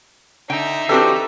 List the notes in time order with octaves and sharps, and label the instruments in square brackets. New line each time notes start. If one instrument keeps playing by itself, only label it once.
[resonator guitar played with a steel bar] D3 G5 [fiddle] D#4 E5
[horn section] E3 D4 G4 [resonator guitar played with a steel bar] C4 F#4 C5 [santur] A4